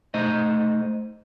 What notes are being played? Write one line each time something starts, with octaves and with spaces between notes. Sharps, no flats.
A3 D#4 C5 D#5